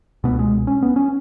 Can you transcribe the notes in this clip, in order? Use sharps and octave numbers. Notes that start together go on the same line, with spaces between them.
C#2 B2 B3
G#3
C#4
B3
C#4